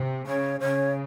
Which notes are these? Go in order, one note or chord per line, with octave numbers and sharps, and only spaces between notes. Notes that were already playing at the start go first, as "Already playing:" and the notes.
Already playing: C3
C#3 C#5
C#3 C#5